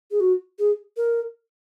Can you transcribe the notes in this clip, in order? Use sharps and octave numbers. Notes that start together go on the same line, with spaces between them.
G#4
F#4
G#4
A#4